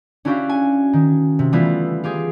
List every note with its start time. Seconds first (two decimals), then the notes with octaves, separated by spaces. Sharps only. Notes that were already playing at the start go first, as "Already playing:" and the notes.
0.25 C#4 D4 E4 F#4 G4 F5
0.49 G#5
0.93 D#3
1.39 C3
1.52 E3 G3 A3 B3 E4 F4
2.04 F4 G4 G#4